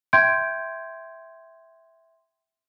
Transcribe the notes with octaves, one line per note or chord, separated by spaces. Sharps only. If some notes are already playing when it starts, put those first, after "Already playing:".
E5 G5 C6 G6 G#6 D7